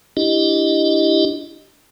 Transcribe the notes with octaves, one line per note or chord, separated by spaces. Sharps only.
D4 E4 G4 D#5